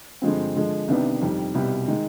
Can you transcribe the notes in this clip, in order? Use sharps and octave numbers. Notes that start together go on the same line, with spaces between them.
G2 D3 F3 G#3 C4
D3 F3 G#3
C2 C3 D#3 B3 D4
F2 D#3 G3
C2 B2 G3
D#3 G#3